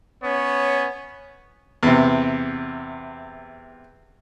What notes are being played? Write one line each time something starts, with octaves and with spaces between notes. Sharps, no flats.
B3 C#4 C#5
E2 C3